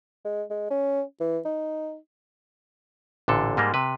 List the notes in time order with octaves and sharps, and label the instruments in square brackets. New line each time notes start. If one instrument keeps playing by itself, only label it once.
[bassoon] G#3
G#3
C#4
E3
D#4
[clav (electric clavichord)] A1 A#2 D3 A4
G#2 G3 G#3 A#3
C3 B4